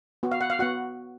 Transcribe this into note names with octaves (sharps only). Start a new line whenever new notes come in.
B3 F#4
F5
F#5
F5
B3 F#4 F#5